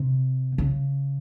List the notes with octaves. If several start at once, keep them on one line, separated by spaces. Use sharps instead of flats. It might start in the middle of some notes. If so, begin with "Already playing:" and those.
Already playing: C3
C#3